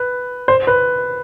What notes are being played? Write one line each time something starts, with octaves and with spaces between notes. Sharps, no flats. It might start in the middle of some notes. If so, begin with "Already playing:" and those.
Already playing: B4
C5
B4